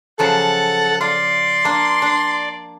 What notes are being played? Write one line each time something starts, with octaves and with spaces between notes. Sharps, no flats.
C#3 F3 F#3 A4 F#5 F#6 A6
F4 D5 C6
A#3 D4
D4